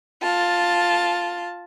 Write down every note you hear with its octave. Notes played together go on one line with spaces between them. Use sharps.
F4 A5